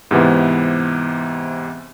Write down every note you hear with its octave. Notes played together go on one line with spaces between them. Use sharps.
G#2 C3 E3 B3